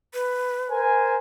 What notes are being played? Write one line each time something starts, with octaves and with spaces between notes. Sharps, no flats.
B4
A#4 C5 G#5